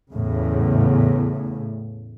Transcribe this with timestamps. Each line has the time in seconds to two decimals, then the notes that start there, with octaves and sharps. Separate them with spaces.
0.13 E2 A2 C#3